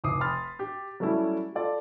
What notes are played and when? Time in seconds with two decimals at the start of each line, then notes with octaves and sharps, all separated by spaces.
0.04 F1 D6 D#6 C7
0.21 B5 C6 D#6 F6 A6
0.59 G4
1.00 F#3 G3 A3 C#4 E4
1.55 F4 A4 D5